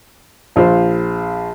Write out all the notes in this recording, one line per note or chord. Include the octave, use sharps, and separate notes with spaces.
A#1 F4 C5